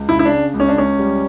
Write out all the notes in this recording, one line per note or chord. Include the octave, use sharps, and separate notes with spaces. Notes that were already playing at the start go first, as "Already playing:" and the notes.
Already playing: C#2
C#3 E4
E4
D4
C#3
C#2
C#4
D4
C#2 C#4
G3